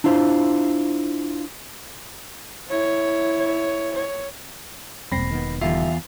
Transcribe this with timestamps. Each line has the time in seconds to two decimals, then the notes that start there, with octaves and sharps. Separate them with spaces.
0.04 D4 E4 F4 C5
2.68 E4 C#5
3.95 C#5
5.12 E1 G3 A#3 C4 B5 A#6 C7
5.31 D#3 B3
5.61 E2 D3 D#3 G3 F4 E5